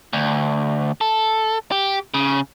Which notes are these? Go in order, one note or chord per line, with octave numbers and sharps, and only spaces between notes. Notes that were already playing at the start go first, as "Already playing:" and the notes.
D2
A4
G4
C#3